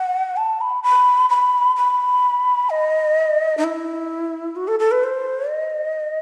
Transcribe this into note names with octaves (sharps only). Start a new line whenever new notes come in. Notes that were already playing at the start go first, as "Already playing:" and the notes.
Already playing: F#5
A5
B5
B5
B5
B5
D#5
D#4
E4
F#4
A4
A4
B4
C5
D#5